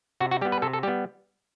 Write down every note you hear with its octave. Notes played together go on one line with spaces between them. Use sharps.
C3 F#4
F#4
G3 B3 G4
B4
C3 A4
A4
G3 B3 G4